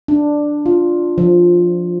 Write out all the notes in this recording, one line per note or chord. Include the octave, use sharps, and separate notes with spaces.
D4
F4
F3